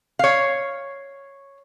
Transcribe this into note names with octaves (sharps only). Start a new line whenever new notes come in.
C#5 F5